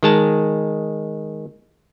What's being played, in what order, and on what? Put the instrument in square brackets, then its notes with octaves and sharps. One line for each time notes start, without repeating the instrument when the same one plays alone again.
[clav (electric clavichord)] D#3 G#3 A5